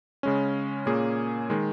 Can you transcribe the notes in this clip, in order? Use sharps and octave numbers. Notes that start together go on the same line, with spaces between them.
C#3 G#3 C#4
A#2 A#3 C#4 G#4
D#3 G#3